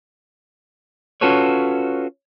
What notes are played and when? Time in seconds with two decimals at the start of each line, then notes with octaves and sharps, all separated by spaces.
1.21 C#4 F4 F#4 A4 B4 C#5